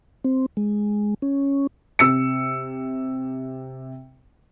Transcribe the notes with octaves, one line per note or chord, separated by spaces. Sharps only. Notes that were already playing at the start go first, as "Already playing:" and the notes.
C4
G#3
C#4
C3 E6 C#7